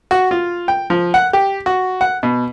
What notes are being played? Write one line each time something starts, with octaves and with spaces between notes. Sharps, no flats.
F#4
F4
G5
F3
F#5
G4
F#4
F#5
B2